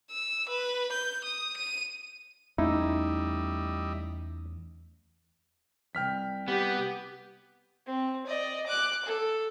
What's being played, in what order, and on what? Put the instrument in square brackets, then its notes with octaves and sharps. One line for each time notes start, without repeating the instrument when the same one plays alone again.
[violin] E6
B4
G6
D#6
D#7
[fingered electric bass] E2 A3 C#4 [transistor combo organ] G3 D#5 E5 [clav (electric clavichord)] D#4 [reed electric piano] E4
[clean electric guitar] C2 F2 [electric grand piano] G5 F6 B6
[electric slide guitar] B3 [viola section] G4
[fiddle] C4
D5 D#5
D6 F#6
A4